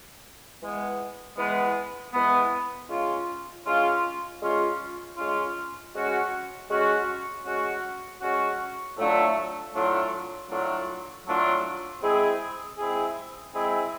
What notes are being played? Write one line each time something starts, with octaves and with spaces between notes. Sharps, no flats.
E3 G#3 B3
E3 G#3 B3
E3 G#3 B3
G#3 C#4 F4
G#3 C#4 F4
G#3 C#4 F4
G#3 C#4 F4
G#3 C#4 F#4
G#3 C#4 F#4
G#3 C#4 F#4
G#3 C#4 F#4
A2 F#3 A3 D4 F4
A2 F#3 A3 D4 F4
A2 F#3 A3 D4 F4
A2 F#3 A3 D4 F4
G#3 C4 E4 G#4
G#3 C4 E4 G#4
G#3 C4 E4 G#4